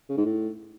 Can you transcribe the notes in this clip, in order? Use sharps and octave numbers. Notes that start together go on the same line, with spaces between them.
C#3
G#2
A2